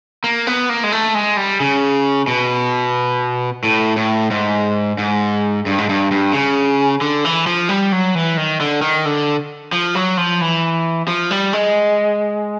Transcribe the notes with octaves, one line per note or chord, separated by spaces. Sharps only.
A#3
B3
A#3
G#3
A3
G#3
G3
C#3
B2
A2
A2
G#2
G#2
G2
G#2
G2
G2
C#3
D3
E3
F3
G3
F#3
E3
D#3
D3
D#3
D3
F3
F#3
F3
E3
F3
G3
G#3